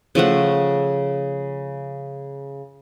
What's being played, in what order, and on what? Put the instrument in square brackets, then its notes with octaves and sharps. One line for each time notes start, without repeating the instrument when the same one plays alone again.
[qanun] C#3 F3 A3 F#5